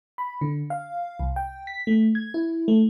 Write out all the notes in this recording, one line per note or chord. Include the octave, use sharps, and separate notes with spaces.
B5
D3
F5
C2
G5
B6
A3
G#6
E4
A3